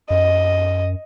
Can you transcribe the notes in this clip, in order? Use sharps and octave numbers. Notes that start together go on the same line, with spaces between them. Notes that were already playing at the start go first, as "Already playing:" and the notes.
F#2 D#5